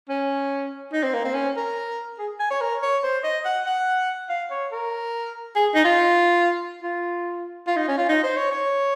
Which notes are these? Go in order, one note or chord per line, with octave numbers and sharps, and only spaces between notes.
C#4
D#4
C4
A#3
C4
C#4
A#4
G#4
G#5
C#5
A#4
C#5
C5
D#5
F#5
F#5
F5
C#5
A#4
G#4
D#4
F4
F4
F4
D#4
C#4
F4
D#4
C5
C#5
C#5